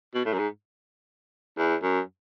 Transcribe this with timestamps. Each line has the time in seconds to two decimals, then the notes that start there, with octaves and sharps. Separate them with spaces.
0.14 B2
0.25 A2
0.33 F#2
0.39 G#2
1.58 E2
1.83 F#2